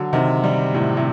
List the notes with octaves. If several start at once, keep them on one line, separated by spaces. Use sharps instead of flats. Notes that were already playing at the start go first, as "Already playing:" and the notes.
Already playing: D3 F#3
C3 D#3
D#3 G3
A2 C3
A2 C3